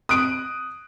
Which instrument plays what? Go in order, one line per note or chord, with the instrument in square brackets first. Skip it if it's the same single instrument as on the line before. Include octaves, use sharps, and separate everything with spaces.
[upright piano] D#6 F#6 D7